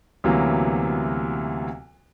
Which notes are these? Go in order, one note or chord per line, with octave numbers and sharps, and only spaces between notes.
D2 C3 E3 F#3 A#3 B3